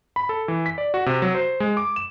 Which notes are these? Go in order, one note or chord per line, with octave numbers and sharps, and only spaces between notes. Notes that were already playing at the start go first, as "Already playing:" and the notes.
B5
A4
E3
B6
D5
F#4
C3
F#3
C5
G#3
D6
E7